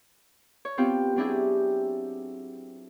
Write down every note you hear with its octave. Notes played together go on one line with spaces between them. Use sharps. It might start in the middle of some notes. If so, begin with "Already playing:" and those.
C#5
B3 C4 F4 G4
F#3 C4 D4 E4 G4 G#4